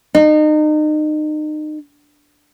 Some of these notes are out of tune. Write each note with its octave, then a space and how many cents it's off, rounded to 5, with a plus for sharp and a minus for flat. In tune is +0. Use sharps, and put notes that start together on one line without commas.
D#4 -30